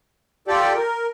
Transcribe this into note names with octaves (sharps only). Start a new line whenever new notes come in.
F4 G4 A4 D5 G5
A#4